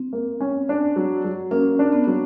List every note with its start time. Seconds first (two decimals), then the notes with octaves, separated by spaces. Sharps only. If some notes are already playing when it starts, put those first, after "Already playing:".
Already playing: C4
0.13 A#3
0.41 C#4
0.69 D4
0.96 F#3
1.24 F#3
1.51 A#3 C#4
1.79 D4
1.92 B3
2.04 F#3 C4